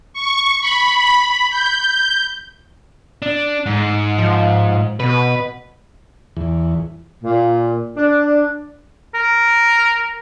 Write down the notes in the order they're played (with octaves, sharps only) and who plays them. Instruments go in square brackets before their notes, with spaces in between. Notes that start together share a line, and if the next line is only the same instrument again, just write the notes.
[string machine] C#6
B5
G6
[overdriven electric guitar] D4
G#2
[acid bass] F3
[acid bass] B2 [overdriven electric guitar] B4
[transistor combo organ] E2
[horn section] A#2
D4
[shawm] A#4